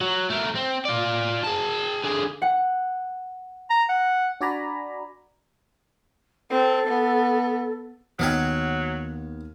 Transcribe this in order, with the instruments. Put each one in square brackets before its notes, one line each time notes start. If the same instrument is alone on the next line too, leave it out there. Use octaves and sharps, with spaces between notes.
[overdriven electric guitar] F#3
A3 A#4
C4
F4 D5
G#4 A5
D3 G#4
[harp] F#5
[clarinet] A#5
F#5
[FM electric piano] D4 F#4 D5 G#5 A#5 B5
[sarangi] C4 [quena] A4
[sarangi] B3
[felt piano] D#2 F6 G#6 [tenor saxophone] F#3 [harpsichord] B3 D#5 G5